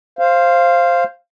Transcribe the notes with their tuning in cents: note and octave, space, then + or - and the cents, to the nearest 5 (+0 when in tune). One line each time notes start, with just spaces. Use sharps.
C5 +10 F5 -10